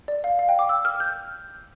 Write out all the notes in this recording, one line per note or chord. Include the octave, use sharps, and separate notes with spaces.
D5
F5
F5
G5
D6
E6
F6
G6